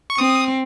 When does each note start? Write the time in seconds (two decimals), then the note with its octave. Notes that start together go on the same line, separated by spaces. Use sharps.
0.10 C#6
0.18 C4 D#6